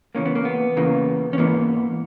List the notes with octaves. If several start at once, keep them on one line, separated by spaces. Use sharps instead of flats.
E2 C#3 E3 A#3 C#4
B3
A#3
B3
E2 C#3 E3 A#3
C#4
G#2 E3 A#3 B3